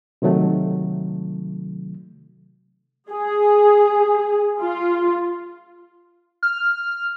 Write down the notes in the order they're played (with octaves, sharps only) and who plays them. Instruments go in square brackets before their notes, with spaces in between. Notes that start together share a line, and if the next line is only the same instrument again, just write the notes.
[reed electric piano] C3 D#3 F#3 A3
[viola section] G#4
F4
[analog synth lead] F6